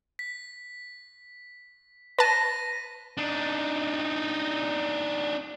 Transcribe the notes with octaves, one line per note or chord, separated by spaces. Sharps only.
B6
B4 A5 A#6 B6 D#7
D4 D#4